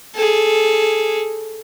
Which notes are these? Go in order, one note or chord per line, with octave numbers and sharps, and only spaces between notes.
G#4 A4